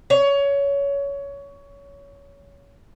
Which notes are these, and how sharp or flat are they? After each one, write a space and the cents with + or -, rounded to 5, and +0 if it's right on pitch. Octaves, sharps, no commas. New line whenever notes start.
C#5 +20